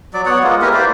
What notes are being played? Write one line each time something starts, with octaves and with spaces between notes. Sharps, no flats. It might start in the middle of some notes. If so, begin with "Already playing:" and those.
F#3 D5
B3 C#5 F#5
G#3 A#3 F4
E4 G4 A#4 B4
A#3 C5 D5